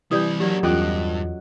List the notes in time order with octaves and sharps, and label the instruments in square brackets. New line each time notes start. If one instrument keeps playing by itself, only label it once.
[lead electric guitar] C3 G3 [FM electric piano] E3 [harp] G4 G6 [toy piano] D5 D#6
[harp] F#3 [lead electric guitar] A#3 D4 [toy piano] G4 D5
[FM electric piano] E2 [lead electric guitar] G2 [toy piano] C#4 F4 A4 [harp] D#5 D6 F#6